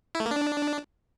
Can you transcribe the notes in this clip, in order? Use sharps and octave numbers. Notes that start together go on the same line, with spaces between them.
E4
A3
A#3
D4